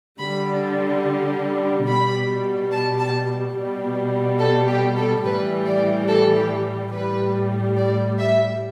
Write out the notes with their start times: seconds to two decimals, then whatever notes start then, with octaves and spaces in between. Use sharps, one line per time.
0.19 D3 G3 B5
1.87 B2 G3 B5
2.72 A5
2.99 A5
3.55 B2 G3
4.39 A4
4.68 G4
4.96 A4
5.24 A2 E3 G3 B4
5.66 D5
6.09 A4
6.36 G4
6.92 A2 G3 B4
7.77 D5
8.19 E5